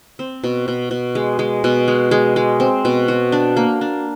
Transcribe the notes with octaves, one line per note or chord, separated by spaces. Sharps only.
C4
B2
B2
B2
G#3
G#3
B2
G#3
G#3
G#3
C4
B2
F#4
D4
A#3
D4